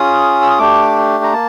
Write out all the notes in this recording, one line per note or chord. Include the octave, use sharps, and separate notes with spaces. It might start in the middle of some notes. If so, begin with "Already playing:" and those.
Already playing: C#4 F4 G#4 D#6
E6
D#6
A3 D4 G4 D6
A#5
A#3 A5